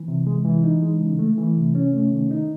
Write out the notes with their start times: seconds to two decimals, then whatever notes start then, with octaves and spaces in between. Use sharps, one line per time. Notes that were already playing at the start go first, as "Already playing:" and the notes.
Already playing: E3
0.08 C3
0.27 G#3
0.45 E3
0.64 D#4
0.82 G#3
1.01 C#3
1.19 A3
1.38 E3
1.56 C3
1.75 C#4
1.93 A3
2.12 D#3
2.31 D#4